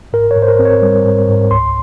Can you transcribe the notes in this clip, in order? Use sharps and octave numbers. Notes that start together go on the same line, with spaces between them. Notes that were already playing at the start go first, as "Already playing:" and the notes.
G#2 A#4
C#5
G#2
C5
A#4
C4
C#5
G3
G#2
G#2
C#2 C6